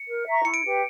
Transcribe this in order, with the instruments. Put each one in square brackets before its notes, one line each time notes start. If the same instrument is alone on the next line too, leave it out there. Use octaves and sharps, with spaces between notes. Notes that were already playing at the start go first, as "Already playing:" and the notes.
Already playing: [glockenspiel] C#7
[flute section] A#4
E5 A#5 C#6
[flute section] E4 [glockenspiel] C#7
[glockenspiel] D7
[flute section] G4 B4